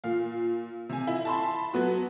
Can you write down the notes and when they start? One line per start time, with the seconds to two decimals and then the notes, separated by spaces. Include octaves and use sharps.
0.04 A#2 F5
0.89 C3 G#5
1.07 E4
1.25 A5 B5 C6
1.73 F#3 B3 F#4